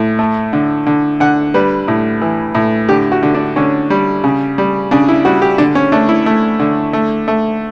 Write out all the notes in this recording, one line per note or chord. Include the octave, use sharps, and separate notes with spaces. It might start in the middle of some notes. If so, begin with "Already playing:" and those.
Already playing: A2
A3
D3
D3
D3 F#5
G3 B4
A2
E3
A2
D3 G4
F#4
D3
D4
D3 C#4
G3
C#3
G3
C#3 D4
E4
G3 F#4
G4
D3 D4
C#4
A3 D4
E4
A3
D3
A3
A3